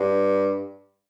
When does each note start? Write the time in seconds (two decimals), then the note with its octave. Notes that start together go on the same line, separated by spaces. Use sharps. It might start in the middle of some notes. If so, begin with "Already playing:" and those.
Already playing: G2